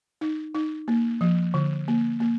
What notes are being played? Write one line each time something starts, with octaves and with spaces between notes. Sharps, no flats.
D#4
D#4
A#3
F3
D3
A#3
A#3